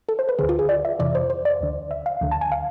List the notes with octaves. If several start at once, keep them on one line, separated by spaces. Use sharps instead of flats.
A4
C5
B4
D2 D3 G#4
F4
G#4
D5
E5
F2 C3 E3 D5
C5
C5
D5
D2 D3
E5
F5
D2 D3
A5
G#5
F5